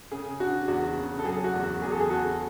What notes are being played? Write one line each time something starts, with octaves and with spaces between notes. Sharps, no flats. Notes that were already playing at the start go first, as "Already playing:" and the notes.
C#3 G#4
D4 F#4
E2 F#4
C#3
A4
F#3 G#4
F#4
E2
F#4
E2 G#4
A4
G#4
E2 F#4 A4